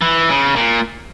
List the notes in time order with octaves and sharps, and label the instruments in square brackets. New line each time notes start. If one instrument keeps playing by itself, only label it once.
[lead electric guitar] E3
C#3
A#2